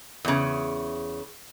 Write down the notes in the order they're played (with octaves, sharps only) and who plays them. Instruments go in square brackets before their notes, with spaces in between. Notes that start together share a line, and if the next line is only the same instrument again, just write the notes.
[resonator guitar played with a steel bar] E2 C#3